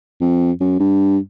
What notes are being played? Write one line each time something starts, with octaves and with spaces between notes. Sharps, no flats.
F2
F#2
G2